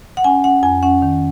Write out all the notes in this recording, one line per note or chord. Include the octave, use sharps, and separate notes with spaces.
F#5
C#4 G#5
C#4 F#5
F2 G#5
C#4 F#5
D#3